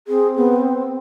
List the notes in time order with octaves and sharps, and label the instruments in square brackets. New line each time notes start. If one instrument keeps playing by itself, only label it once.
[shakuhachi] C4 [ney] G#4
[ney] B3